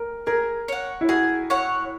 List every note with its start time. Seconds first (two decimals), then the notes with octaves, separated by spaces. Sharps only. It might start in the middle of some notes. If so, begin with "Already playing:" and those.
Already playing: A#4
0.27 G#4 A#4
0.68 C#5 F#5
1.01 E4
1.09 F#4 G#4
1.50 C#5 F#5